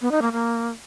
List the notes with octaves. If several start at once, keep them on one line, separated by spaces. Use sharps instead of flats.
B3
D#4
A#3
A#3